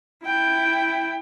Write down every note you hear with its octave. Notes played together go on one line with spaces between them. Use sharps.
E4 G5